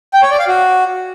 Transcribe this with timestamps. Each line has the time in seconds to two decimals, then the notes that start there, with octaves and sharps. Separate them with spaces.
0.14 G5
0.22 C#5
0.31 D5
0.39 F5
0.48 F#4